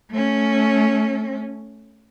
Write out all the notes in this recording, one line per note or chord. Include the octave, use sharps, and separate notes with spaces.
A3 C#4